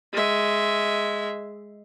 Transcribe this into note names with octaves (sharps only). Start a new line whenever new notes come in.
G#3 E5